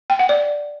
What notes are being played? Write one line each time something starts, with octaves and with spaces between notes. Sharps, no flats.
G5
F#5
D5